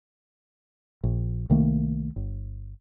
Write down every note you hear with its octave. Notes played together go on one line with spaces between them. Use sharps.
A#1
C2 D#3 A3 A#3
G1